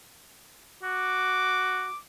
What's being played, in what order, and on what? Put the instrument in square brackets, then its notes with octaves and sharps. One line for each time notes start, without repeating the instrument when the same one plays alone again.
[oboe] F#4 [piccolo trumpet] D6